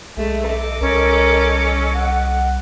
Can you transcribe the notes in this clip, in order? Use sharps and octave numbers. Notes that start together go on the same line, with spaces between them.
B1 G#3 A3
A4 D#5 D6
C2 C#4 A#4
F#5